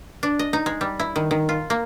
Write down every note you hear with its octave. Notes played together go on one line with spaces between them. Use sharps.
D4
D#5
D#4
G#3
G3
E4
D#3
D#3
F4
A#3